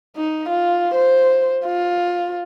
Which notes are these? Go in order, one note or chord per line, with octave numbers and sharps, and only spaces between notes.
D#4
F4
C5
F4